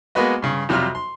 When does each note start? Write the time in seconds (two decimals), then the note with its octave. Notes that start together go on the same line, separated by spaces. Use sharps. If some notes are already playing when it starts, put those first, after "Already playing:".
0.15 G#3 A#3 B3 F#4 B4 D#5
0.42 G2 C#3
0.69 F2 C3 F#3 G3 F4 F6
0.95 C6